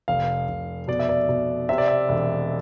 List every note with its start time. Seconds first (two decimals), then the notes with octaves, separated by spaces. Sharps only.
0.08 F1 F5
0.49 F1
0.88 B2 D5
0.99 E5
1.09 D5
1.29 B2
1.69 C3 E5
1.78 D5
1.88 E5
2.09 E1